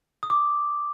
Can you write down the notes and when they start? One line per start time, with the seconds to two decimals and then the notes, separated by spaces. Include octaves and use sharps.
0.23 D#6
0.30 D6